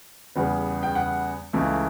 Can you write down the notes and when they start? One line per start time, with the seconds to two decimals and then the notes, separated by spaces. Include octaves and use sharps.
0.36 E2 C#3 G3 B3
0.83 G5
0.95 F#5
1.53 C#2 C#3 E3 A3